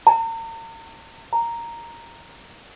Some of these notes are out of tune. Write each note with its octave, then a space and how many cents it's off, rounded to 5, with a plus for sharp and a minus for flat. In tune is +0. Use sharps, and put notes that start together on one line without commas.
A#5 -40
A#5 -5